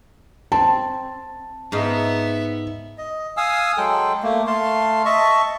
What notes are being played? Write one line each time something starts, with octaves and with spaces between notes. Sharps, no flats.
C4 A5
G#2 B3 D#4 E5 F5
D#5
F5 G#5 D#6 E6
F#3 G#3 A4 G5
A3 A#3
A3 F5 A5 C6
D#5 E5 A5 C#6